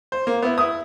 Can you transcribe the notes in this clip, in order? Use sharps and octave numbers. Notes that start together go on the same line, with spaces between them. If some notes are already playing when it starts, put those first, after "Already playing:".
C5
A#3
B3 E4
E4 D#6